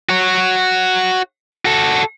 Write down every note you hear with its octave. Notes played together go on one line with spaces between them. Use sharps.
F#4 C#5
F#4 A4